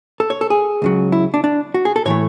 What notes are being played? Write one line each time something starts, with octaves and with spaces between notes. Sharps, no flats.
A4
C#5
A4
G#4
C#2 C#3 F#3
E4
D4
D4
F#4
G#4
A4
A2 E3 A3 C#5